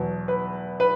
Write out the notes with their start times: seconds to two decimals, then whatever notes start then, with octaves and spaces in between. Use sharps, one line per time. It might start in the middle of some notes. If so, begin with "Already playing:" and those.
Already playing: E2 B2 F#3
0.28 B4
0.80 B4